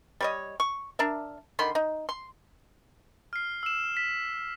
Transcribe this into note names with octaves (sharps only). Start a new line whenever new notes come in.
G3 C#5 D#5
C#6
D4 A#4 E5
D3 D#3 B5 C6
D#4
C6
F6 C7
E6 E7
B6